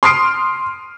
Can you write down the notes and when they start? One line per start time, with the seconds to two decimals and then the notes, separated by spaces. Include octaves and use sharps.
0.03 C6 D#6 F6 C7 D7